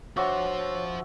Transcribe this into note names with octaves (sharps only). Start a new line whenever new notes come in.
F3 D4 F#4 C5 C#5 E5